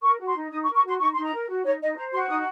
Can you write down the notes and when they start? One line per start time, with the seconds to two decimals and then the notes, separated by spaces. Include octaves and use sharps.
0.02 A#4 C#6
0.19 F#4
0.27 C6
0.35 D#4
0.50 D#4 D#6
0.63 C#6
0.68 A#4
0.75 C#6
0.84 F#4 C6
1.00 D#4 C#6
1.14 D#4 C6
1.24 A#5
1.32 A#4
1.49 F#4
1.64 D#4 C#5
1.81 D#4 D#5
1.96 C5 A#5
2.12 F#4 C6
2.29 D#4 D#6